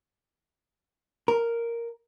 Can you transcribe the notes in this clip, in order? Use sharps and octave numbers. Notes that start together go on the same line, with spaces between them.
A#4